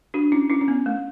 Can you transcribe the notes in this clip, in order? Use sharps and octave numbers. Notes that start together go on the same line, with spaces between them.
D4 F#4
C#4 E4
C#4 E4
C#4
B3
A3